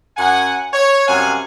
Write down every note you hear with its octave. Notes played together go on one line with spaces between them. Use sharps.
F#2 F#5 G#5
C#5
F#2 C3 G3 F5 F#5 G#5